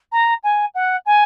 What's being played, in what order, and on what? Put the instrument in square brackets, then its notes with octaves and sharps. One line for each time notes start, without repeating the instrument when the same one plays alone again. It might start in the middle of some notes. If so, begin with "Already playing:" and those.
[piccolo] A#5
G#5
F#5
G#5